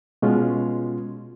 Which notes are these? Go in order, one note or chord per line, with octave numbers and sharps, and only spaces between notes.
B2 G#3 C#4 F4